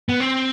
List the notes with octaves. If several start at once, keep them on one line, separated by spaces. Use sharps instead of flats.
B3
C4